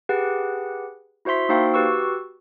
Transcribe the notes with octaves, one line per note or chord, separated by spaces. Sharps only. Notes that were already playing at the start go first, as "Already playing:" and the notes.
G4 G#4 B4 F#5
E4 F#4 C5 E5 C6 B6
A#3 D#4 F#4 C5 F5 G5
F#4 G4 B4 C#6 E6